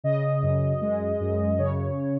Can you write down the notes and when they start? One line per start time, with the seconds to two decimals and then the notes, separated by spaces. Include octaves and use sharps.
0.04 C#3 D#5
0.42 F#2
0.81 G#3
1.20 F#2
1.58 C#3 C#5